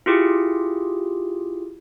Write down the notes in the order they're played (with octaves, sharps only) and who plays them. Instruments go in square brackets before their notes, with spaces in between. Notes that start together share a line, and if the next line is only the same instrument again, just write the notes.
[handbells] E4 F4 G4 G#4